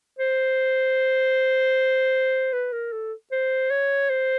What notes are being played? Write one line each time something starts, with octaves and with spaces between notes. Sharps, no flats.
C5
B4
A#4
A4
C5
C#5
C5